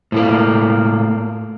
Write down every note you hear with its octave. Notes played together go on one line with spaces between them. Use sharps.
A2 A3 A#3